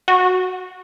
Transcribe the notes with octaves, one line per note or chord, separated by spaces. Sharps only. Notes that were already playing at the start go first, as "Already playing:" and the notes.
F#4